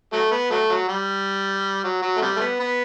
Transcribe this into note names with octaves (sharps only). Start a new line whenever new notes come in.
F#3 A3
B3
F#3 A3
F#3
G3
F#3
F#3
A3
C3 G3
A3
B3
B3